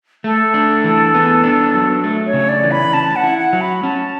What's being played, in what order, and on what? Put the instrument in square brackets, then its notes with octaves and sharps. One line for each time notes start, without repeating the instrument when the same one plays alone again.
[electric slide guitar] A3 [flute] A4
[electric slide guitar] D4
E3
B3
D4
F#3
A3
[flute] C#5
[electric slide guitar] C#3
[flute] D5
[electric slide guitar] E3
[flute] B5
[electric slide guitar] C#4 [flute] A5
[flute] F#5
[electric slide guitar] E4
[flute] F#5
[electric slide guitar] F#3
[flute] B5
[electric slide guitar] C#4 [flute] A5